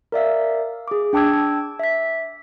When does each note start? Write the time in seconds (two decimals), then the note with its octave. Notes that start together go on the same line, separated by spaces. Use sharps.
0.12 A#4 D5 E5 F5
0.88 G#4 D6
1.13 D4 G5 A5 D6 E6 G#6
1.79 E5 B6